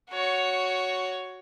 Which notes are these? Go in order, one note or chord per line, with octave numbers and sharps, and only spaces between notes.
F#4 C#5